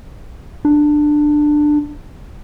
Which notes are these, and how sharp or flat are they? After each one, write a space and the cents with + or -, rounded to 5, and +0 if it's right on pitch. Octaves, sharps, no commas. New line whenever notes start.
D4 +15